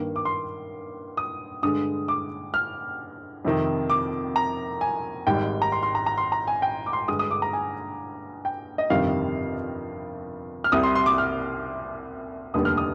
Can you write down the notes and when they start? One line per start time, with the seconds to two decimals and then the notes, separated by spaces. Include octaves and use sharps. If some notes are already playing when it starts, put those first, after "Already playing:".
Already playing: G2 D#3 A#3
0.16 D6
0.25 C6
1.17 D#6
1.63 G2 D3 G#3 D#6
2.08 D6
2.54 F6
3.45 F2 C3 D#3
3.90 D6
4.36 A#5
4.81 G#5
5.27 G#1 G#2 G3 G5
5.62 A#5
5.72 C6
5.83 C6
5.95 A#5
6.06 A#5
6.18 C6
6.32 A#5
6.47 G#5
6.62 G5
6.86 D6
6.93 C6
7.08 G2 D3 G#3 D#6
7.19 D#6
7.31 D6
7.42 A#5
7.53 G#5
8.45 G5
8.78 D#5
8.90 G1 F2 C3 D#3 G3 F5
10.64 F6
10.72 C2 C3 G3 D#6
10.83 C6
10.95 C6
11.06 D6
11.18 F6
12.54 F1 D#2 D3 G3 D#6
12.65 F6
12.77 D#6